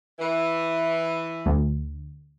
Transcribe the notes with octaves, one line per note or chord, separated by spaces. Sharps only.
E3
D2